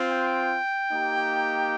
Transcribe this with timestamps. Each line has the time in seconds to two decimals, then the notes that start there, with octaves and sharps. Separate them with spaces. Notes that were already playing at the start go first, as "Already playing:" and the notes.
Already playing: C4 F4
0.11 G5
0.92 A#3 D#4 G4